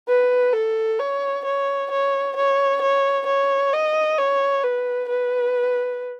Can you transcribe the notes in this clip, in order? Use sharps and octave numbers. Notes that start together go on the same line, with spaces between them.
B4
A4
C#5
C#5
C#5
C#5
C#5
C#5
D#5
C#5
B4
B4